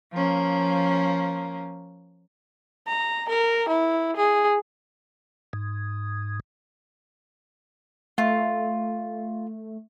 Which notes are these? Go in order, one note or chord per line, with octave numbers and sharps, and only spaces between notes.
F3 A#3 C#4
A#5
A#4
E4
G#4
G#2
A3 F4